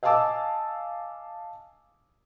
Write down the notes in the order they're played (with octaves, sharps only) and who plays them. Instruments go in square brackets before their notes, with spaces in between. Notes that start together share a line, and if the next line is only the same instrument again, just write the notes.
[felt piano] D#5 F5 G#5 A5 D6 E6